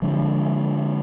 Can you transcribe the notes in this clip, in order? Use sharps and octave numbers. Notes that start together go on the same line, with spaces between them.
D3 F3 G#3 D4